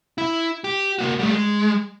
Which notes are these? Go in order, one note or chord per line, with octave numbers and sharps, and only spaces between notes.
E4
G4
A#3 F#4
G3 A3
G#3